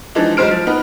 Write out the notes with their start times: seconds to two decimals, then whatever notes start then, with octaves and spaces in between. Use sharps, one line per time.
0.15 E3 F3 G#3 D4 D#4
0.37 B1 F#3 G#3 C5 F6 D7
0.51 F3
0.67 B3 D#4